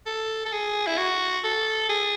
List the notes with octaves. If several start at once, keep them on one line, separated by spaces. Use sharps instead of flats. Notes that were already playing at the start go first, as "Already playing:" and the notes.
A4
A4
G#4
E4
F#4
A4
G#4